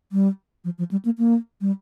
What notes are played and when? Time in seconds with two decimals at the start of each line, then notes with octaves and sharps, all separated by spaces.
0.12 G3
0.64 F3
0.78 F3
0.91 G3
1.05 A#3
1.18 A#3
1.61 G3